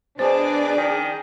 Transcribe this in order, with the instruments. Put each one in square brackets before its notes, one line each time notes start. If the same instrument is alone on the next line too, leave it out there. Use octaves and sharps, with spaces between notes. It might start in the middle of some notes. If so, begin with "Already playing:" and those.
[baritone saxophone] B2 [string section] D4 D5 [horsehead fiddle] G#4 [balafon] C5
[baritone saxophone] D#3